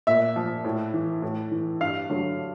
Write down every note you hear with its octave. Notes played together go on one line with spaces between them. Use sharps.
A#2 E5
F3
A2
E3
A2
E3
G2 F5
D3 F#3